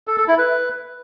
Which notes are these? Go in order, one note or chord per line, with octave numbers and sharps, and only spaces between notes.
A4
A4
E4
B4